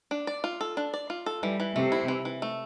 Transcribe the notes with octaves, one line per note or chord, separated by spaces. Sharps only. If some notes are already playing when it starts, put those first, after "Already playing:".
D4
D5
F4
A4
D4
D5
F4
A4
E3 G3
E3
C3 A3
E4
E3
E3
A3